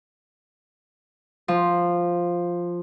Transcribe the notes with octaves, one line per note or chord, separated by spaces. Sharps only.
F3